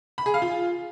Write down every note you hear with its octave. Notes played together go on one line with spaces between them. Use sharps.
B5
G#4
F5
F4